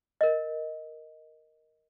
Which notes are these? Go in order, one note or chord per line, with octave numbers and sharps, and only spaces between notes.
A#4 D#5